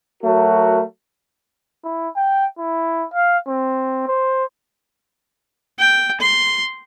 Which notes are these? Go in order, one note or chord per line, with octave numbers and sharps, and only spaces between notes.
F#3 A3 F#4 A#4
E4
G5
E4
F5
C4
C5
G5
C6